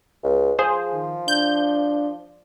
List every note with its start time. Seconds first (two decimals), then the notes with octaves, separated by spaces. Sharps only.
0.23 C#2
0.59 F3 G#4 C5
0.93 D#3
1.28 D4 G6